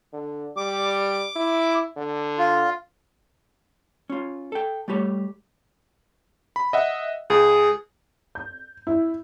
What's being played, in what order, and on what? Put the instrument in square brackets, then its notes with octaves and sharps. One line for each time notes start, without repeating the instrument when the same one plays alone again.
[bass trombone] D3
[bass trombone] G3 [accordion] D6
[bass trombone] E4
D3
[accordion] F4
[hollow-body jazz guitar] C#4 F4
A4 G5
G3 A3 G4 C#5
[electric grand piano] B5
D#5 E5 F#5
[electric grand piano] C#2 [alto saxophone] G#4
[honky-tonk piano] G6
E4